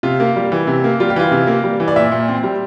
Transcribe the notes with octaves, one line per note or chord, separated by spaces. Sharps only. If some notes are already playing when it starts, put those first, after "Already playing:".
C3 F4
A#3
G3
E3
C3
A#3
G3 F4
G4
E3 F4
C3
A#3
G3
E3
D5
A#2 E5
A#2
C4
G3